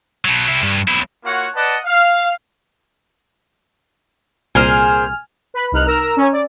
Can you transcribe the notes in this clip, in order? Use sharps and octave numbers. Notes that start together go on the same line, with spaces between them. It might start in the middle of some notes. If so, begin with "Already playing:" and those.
B2 F#3
C3 E4
G2
B1 E4
A#3 F4 F#4 C#5 F#5
B4 D5 D#5 F#5 A5
F5
C2 A#2 A#3 G#4 C5 G#5 F6
B4 B5
C2 D#4 F6 F#6
A#4 A#5 E6
C#4 C#5 G#5
D5